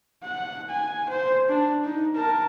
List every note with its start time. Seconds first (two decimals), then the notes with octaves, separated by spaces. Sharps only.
0.23 F#5
0.70 G#5
1.09 C5
1.49 D4
1.84 D#4
2.15 A#4 A5